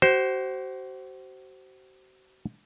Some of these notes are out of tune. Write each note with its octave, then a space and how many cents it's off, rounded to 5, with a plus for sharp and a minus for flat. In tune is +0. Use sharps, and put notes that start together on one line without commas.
F#4 +40 C5 +0